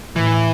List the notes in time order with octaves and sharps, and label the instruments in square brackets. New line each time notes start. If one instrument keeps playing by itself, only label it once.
[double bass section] A2 [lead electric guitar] E3